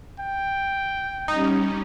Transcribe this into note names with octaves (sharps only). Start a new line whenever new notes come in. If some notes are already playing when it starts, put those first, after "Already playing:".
G5
G3 C#4 D#4